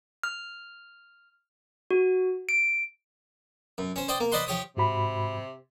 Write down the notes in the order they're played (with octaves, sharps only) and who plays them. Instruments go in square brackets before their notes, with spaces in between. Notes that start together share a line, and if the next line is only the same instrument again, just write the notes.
[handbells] F6
F#4
D7
[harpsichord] F#2
C#4 C5
C5 D5 D#5 G5
A#3
B4 C5 D5 D#5 F#5 C6
F3 G4 C#5 D#6
[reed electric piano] G#2 F#4 B5 [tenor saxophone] C3